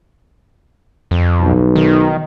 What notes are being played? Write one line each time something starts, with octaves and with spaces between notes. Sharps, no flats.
F2
B1
D#3